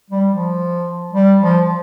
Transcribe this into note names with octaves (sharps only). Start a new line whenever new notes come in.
G3
F3
G3
F3